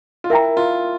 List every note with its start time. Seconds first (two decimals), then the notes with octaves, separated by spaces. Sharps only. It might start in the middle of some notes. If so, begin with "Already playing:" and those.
0.24 F4
0.30 E4 A#4 E5 G5 A#5
0.57 F4